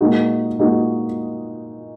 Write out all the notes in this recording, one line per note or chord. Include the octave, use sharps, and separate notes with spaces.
A#2 G#3 D#4 F#4
A#2 G#3 D#4 F#4